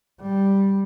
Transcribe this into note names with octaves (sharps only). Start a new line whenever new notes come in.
G3